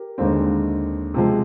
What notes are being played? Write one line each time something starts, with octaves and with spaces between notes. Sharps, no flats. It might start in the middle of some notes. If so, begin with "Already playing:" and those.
Already playing: G4 A#4
D#2 D3 G#3 C4
C3 F3 G#3